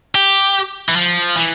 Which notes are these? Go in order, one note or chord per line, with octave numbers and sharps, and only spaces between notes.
G4
E3
F3
E3